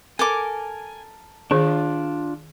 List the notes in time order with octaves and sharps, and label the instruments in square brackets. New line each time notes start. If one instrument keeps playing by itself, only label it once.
[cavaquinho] A4 A#4 D6 [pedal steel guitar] G#5
[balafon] D#3 G#4 [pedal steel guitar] D4 F4